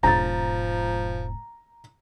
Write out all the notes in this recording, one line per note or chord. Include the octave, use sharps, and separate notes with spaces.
E1 G#2 F3 A#5 A6